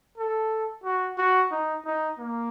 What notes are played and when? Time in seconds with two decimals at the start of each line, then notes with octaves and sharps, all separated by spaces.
0.18 A4
0.84 F#4
1.18 F#4
1.51 D#4
1.85 D#4
2.19 A#3